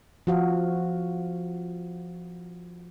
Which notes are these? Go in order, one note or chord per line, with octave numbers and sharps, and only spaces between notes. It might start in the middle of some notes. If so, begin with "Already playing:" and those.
F3 F#4 F5